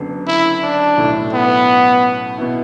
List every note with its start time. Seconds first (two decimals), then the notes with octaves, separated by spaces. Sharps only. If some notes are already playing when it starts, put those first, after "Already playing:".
Already playing: F#1 F#2 D3 B3
0.28 E4
0.63 D4
0.97 B1 A2 A3 E4
1.33 B3
2.38 B2 B3 E4